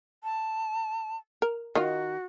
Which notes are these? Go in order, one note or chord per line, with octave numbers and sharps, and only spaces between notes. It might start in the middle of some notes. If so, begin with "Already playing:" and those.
A5
A#4
D#3 D#4 F4 F#4